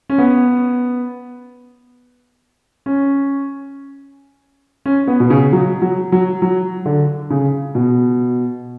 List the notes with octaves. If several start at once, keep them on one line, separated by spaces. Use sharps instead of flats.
C#4
B3
C#4
C#4
B3
B2
C#3
F#3
F#3
F#3
F#3
D3
C#3
B2